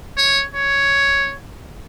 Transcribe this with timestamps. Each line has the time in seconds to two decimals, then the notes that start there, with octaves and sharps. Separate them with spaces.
0.17 C#5
0.55 C#5